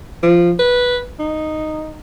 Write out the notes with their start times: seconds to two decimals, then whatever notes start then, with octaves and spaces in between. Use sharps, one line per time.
0.23 F3
0.59 B4
1.19 D#4